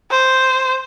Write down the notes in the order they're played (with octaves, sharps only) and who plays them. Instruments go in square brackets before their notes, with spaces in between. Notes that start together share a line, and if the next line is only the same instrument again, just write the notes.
[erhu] C5